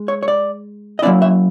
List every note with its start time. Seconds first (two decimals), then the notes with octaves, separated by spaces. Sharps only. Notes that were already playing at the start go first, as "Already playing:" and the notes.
Already playing: G#3
0.08 C#5
0.23 C#5
0.28 D5
0.99 D#5
1.02 F#3 A#3 C#4 E4 D5
1.22 E5